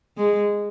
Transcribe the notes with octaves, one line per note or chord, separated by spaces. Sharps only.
G#3